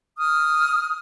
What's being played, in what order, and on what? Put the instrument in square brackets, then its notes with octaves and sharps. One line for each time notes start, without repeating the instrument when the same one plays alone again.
[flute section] D#6 F6